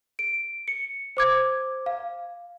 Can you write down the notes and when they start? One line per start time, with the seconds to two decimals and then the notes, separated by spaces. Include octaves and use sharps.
0.19 D7
0.68 C#7
1.17 C5 D6 G#6
1.86 F5